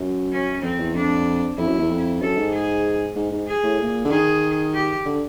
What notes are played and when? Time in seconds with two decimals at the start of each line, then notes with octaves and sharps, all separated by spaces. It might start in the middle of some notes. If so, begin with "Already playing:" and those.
Already playing: F#2
0.32 C#4
0.63 F2 C4
0.79 E2
0.95 F2 D4
1.58 F2 E4
1.68 F#2
1.79 E2
1.90 F2
2.21 F#2 A4
2.37 G#2
2.53 G#4
3.16 G#2
3.32 G#2
3.47 G#4
3.63 A2
3.80 A#2
4.05 D3
4.11 D#3 G#4
4.74 G4
5.05 D3